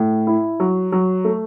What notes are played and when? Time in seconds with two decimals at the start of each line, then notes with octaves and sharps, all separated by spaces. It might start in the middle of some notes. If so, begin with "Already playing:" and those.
Already playing: A2
0.27 E4
0.60 F#3
0.92 F#3
1.25 A3